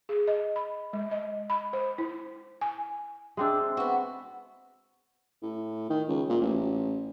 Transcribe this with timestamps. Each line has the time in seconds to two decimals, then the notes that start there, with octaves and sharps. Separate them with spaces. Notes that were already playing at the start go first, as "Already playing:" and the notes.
0.09 G#4
0.28 D#5
0.56 B5
0.93 G#3
1.11 D#5
1.50 B5
1.73 C5
1.98 E4
2.61 G#5
3.37 G#3 C4 D4 E5 E6
3.77 B3 F#4
5.42 A2
5.90 D#3
6.08 C#2
6.29 A#2
6.41 A1